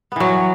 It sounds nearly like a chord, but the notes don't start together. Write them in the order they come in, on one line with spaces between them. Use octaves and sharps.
B3 E3 F#3